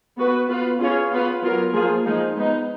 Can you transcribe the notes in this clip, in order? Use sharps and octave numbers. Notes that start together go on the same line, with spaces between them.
B3 F#4 B4
B3 F4 B4
C#4 F4 G#4 C#5
B3 F4 B4
F#3 B3 F4 A#4
F3 A#3 F4 G#4
F3 G#3 D#4 G#4
G#3 B3 D#4